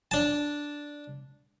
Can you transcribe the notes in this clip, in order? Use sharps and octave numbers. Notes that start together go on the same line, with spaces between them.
D4 A5